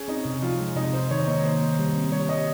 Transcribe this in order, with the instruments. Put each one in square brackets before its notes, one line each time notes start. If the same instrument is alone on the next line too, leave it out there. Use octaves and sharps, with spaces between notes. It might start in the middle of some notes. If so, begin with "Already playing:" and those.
Already playing: [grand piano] C#4 [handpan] G#4
[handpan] C4 [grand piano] D#4
[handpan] C3
[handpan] F3 [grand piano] F4
[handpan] G#3
[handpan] C3 [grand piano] D#4
[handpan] C3 [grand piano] C5
[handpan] D#3 [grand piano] C#5
[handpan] A#3 [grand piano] D#5
[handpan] D#3 [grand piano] C5
[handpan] D#3
G3
C4
[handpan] G3 [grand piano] C#5
[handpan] G3 [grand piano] D#5